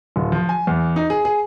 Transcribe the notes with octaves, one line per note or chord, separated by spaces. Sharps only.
D1
F3
G#5
E2
D#4
G#4
G#4